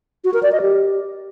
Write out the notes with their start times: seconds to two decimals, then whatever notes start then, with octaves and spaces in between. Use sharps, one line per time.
0.24 F#4
0.34 A#4
0.43 D5
0.52 D#5
0.61 G4